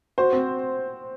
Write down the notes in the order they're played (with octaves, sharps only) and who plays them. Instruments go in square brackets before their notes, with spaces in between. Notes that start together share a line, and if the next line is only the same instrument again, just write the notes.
[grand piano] F#4 [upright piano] C5
[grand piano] C4